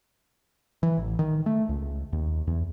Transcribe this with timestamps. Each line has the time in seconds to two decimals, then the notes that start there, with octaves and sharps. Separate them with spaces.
0.83 E3
0.98 A1
1.19 D#3
1.46 A3
1.69 C#2
2.13 D#2
2.47 E2